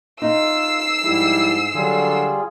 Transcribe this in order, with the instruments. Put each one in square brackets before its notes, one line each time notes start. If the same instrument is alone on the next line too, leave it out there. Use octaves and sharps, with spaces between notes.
[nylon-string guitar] D#4 [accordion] F4 [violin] E6 C7
[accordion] G#2 [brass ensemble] F3 G3 E4
[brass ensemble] D3 F#3 [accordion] G3 F4 G#4